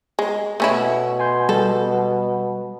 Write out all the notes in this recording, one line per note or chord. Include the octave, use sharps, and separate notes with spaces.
G#3
B2 A3 C#4 E4
G#5 C6 G6
G3 A4